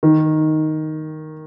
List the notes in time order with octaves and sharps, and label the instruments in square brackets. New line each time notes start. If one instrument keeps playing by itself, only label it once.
[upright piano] D#3